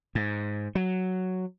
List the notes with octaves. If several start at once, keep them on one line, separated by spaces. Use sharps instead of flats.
G#2
F#3